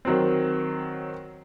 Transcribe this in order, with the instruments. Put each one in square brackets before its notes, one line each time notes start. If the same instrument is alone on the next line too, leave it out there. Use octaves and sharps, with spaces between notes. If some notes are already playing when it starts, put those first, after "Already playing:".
[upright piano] D#3 F#3 C4